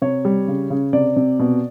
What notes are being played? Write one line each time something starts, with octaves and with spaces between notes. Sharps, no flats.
C3 C#5
G3
C#3
C#3
C3 D5
C3
B2